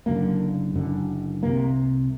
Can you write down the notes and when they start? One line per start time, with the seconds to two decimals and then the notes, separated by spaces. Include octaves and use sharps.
0.06 F#1 F#2 D3 A#3
0.74 F#1 F#2 D3
1.42 C2 C3 A#3